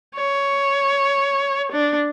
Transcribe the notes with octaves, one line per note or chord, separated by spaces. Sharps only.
C#5
D4